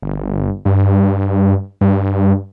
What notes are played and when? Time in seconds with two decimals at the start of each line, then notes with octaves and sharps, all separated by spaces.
0.03 G1
0.65 G2
1.81 G2